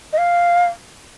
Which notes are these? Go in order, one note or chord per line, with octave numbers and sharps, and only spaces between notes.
D#5
F5